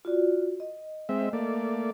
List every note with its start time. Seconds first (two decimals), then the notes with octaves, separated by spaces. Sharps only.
0.05 F4 F#4 D5
0.60 D#5
1.09 G#3 C4 E5
1.33 A3 A#3 D5